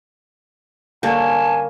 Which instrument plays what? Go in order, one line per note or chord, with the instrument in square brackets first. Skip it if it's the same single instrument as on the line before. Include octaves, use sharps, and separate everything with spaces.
[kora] G2 D3 C#4 [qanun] A#3 [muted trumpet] G#5 [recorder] A5